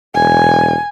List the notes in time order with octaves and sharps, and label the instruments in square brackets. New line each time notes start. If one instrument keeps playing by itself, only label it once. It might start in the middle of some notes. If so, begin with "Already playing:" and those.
[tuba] E1 [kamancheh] G#5